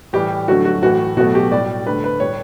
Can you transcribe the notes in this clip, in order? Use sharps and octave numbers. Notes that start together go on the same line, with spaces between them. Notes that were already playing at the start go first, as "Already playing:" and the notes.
A2 E3 G3 G4
D3 F#3 A3 F#4
F#4
A2 E3 A3 F#4
B2 F#3 A3 F#4
G4
A2 G3 D5
D3 A3 B4
B4
A2 G3 C#5